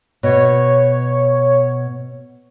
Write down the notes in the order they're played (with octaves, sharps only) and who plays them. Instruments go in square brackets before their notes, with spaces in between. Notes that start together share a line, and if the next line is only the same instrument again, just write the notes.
[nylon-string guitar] B2 [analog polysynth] C#5